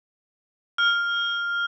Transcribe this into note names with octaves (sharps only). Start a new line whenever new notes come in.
F6